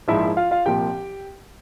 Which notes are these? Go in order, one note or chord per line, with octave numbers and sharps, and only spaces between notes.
A#1 G#2 F3 E4 E5
F4 F5
F4 F5
C2 A#2 F3 G4 G5